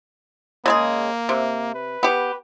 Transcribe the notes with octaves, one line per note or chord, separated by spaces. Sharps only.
C#3 G#3 A#3 G#4
C3
B4
B3 G4